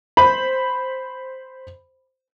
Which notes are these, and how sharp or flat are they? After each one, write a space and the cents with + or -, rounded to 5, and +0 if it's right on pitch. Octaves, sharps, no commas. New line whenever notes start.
C5 +0 B5 +5